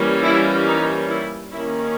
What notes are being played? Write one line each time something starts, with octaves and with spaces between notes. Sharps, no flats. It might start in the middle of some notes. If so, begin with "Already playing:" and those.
Already playing: E3 G3 A#3 C#4
E4
D#4
E4
D#3 A#3 C#4 E4